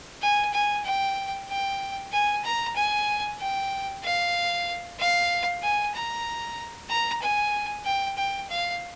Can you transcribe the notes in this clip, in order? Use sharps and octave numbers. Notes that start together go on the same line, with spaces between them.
G#5
G#5
G5
G5
G#5
A#5
G#5
G5
F5
F5
G#5
A#5
A#5
G#5
G5
G5
F5